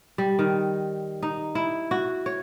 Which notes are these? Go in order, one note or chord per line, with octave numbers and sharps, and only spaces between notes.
G3
D#3
D#4
E4
F#4
C#5